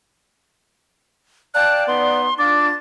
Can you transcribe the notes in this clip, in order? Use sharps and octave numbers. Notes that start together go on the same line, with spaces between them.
D5 F5 G5 A5 F#6
B3 D#4 C6
D4 F4 D6 A6